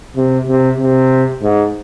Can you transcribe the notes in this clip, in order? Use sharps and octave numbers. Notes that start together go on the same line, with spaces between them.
C3
C3
C3
G#2